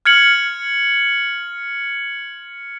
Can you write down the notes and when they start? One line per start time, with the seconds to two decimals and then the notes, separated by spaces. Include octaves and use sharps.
0.05 F6 G#6 C#7 F#7